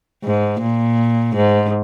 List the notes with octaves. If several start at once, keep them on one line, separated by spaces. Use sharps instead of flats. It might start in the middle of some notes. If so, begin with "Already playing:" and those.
G#2
A#2
G#2